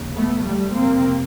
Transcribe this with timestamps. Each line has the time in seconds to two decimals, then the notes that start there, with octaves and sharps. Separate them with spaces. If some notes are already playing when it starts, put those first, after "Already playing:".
Already playing: F1 D#2 C#3
0.12 A3 B3
0.43 G3 A3
0.74 F1 F2 C3 A#3 C4